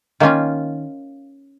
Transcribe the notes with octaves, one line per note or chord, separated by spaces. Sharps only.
D#3 A#3 C#4 F4